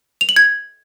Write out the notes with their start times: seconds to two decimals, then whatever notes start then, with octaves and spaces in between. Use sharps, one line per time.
0.21 F7
0.29 F#7
0.36 G#6